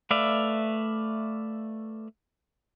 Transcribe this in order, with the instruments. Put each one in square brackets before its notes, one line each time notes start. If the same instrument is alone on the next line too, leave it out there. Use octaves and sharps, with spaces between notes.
[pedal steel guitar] A3 B4 D5 E5 F5